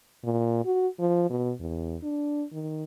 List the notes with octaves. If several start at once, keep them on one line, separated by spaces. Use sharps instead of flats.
A#2
F#4
F3
B2
E2
D4
D#3